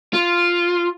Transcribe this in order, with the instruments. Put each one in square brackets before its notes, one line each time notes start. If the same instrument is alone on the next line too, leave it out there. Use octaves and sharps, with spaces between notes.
[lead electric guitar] F4